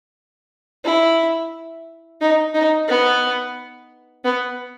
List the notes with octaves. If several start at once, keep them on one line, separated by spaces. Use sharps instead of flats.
E4
D#4
D#4
B3
B3